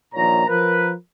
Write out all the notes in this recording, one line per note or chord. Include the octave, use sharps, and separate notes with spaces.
A#1 A#2 D#3 C#5 A#5
F3 A#4 B4